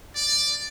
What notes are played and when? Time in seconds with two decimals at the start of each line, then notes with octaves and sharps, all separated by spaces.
0.16 D5